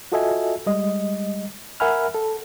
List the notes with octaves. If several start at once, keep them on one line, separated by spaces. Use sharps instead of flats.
F4 F#4 A4 D#5 E5 G#5
G3 G#3 D#5
A#4 E5 F#5 G#5 B5 F6
A4